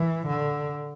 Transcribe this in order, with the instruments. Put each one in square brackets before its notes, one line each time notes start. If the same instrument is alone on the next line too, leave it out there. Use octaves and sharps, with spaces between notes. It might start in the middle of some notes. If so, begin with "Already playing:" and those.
Already playing: [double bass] E3
D3